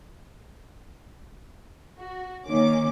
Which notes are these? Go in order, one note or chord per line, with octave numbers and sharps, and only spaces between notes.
F#4
D#3 A#3 C#4 D6